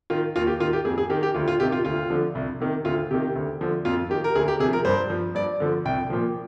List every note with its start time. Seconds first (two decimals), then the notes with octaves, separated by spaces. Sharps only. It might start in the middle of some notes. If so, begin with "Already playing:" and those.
0.10 D#3 F4
0.36 D#2 F4
0.47 G4
0.60 D#3 F4
0.73 G4
0.85 F2 G#4
0.98 G#4
1.10 D#3 G4
1.23 G4
1.34 D2 F4
1.48 F4
1.60 C3 D#3 G4
1.72 F4
1.85 D2 F4
2.10 D3 F3
2.35 C2
2.60 C3 D#3
2.85 D2 F4
3.11 C3 D#3 G4
3.35 D2
3.61 D3 F3
3.85 F2 F4
4.10 D#3 G4
4.24 A#4
4.35 D2 G#4
4.48 G4
4.60 C3 G#4
4.65 F3
4.73 A#4
4.85 G2 C5
5.10 F3
5.35 G2 D5
5.60 D3 F3
5.85 C2 G5
6.10 A#2 F3